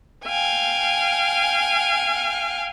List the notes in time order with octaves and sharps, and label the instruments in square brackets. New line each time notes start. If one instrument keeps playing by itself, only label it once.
[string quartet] F5 G5 G#5